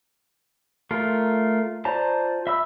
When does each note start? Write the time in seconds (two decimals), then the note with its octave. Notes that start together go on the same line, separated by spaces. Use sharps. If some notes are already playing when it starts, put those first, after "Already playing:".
0.91 A3 F4 A#4
1.85 F4 C5 D5 A5 A#5
2.47 E5 B5 E6